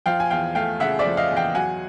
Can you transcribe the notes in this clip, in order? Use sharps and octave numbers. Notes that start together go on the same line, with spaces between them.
F3 F5 G5
G#5
E2 F5 G5
A3 F5 G5
C#3 E5 F#5
D5 E5
F3
D#5 F5
E2
F5 G5
F#3 F#5 G#5